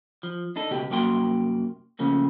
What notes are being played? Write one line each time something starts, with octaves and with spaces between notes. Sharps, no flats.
F3
D4 D#4 A4
C#2 B2 B3 F#4 G4 G5
C2 F#2 A#3 F#4 G5 C6
C#3 F3 A3 A#3